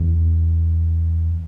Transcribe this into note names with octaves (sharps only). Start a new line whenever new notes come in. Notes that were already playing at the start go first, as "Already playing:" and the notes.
Already playing: E2